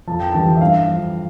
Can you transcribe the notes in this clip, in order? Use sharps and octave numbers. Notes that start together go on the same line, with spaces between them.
F2 A5
G5
E3 G3 A5
E5
G2 F5
F3